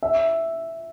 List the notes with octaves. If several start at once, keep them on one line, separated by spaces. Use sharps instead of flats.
E5